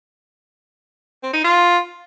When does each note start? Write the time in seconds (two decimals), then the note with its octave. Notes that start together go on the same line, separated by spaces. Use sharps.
1.23 C4
1.33 D#4
1.44 F4